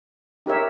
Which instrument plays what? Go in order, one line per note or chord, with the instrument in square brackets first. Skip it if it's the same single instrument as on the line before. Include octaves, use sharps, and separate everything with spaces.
[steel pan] D#4 G4 A#4 C#5 E5